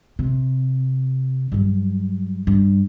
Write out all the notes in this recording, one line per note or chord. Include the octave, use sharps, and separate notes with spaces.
C3
G2 F#3
G2